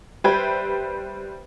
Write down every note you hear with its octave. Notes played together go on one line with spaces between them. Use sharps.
G3 B4 C5 E5 G5 G#6